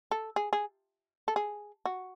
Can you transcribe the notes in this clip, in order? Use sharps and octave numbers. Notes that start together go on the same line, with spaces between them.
A4
G#4
G#4
A4
G#4
F#4